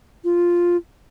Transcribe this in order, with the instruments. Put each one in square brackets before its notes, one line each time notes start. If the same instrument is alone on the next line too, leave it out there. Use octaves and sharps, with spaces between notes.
[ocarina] F4